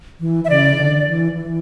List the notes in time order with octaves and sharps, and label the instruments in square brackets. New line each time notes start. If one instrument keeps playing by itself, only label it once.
[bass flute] E3
[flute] E5
[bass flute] C#3 [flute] D5
[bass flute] E3
D3
E3
E3